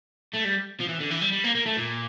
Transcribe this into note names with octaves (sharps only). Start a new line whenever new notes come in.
A3
G3
F3
E3
D3
E3
G3
G3
A#3
A#3
A3
A#2